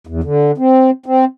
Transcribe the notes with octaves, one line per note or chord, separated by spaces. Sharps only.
E2
D3
C4
C4